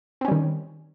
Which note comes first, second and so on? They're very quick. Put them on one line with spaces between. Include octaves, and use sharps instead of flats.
C4 C#4 G3 D#3